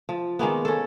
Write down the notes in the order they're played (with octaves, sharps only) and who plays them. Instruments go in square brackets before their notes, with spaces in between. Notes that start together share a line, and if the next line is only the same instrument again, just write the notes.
[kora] F3
D#3 G#3 A#3 B3
C#4 A4